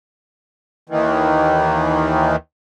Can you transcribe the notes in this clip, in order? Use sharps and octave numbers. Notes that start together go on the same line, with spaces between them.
D#2 D#3 E3